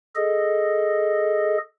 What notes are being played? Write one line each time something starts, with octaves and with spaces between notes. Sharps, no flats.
G#4 A4 D#5